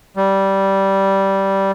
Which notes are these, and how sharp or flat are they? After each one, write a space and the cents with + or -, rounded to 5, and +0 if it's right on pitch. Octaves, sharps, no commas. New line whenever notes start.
G3 -10